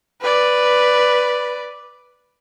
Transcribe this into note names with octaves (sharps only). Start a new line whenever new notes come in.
B4 D5